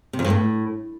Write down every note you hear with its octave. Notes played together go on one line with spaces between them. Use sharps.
C3
F2
G2
A2